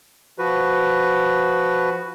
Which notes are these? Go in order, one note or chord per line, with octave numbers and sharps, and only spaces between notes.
F3 F#4 B4